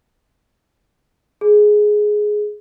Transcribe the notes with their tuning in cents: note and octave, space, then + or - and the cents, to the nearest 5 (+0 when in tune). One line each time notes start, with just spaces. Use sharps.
G#4 +10